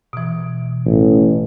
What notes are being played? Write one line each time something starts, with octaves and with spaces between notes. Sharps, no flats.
B2 E3
A1